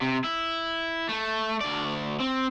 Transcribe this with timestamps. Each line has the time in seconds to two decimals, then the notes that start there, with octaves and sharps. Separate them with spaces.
0.01 C3
0.24 E4
1.09 A3
1.61 D2 D5
2.20 C4